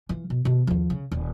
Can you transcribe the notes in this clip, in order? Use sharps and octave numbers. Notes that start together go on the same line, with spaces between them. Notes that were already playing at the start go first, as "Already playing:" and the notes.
E3 F4
B2
B2 D#3
D#2 F3
C#3
D#1